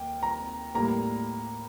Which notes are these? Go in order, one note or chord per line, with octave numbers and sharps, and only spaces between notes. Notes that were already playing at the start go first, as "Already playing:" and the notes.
Already playing: D#2 G5
A#5
A2 G3 A#3 A#5